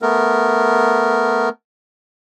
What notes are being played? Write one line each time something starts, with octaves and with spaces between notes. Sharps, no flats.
A3 B3 A#4